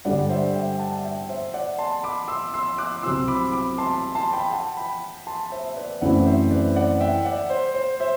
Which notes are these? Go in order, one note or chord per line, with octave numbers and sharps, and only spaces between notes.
G2 D3 G3 D4 D5 F#5
C5 E5
E5 G5
G5
F#5 A5
E5 G5
C5 E5
D5 F#5
A5 C6
B5 D6
C6 E6
C6 E6
D6 F#6
C2 C3 F#3 C4 E4 C6 E6
B5 D6
B5 D6
A5 C6
A5 C6
G5 B5
F#5 A5
G5 B5
A5 C6
C5 E5
E5
B4 D5
F#2 E3 A3 C4 E4 D5 F#5
C5 E5
B4 D5
D5 F#5
E5 G5
D5 F#5
C5
C5
C5 E5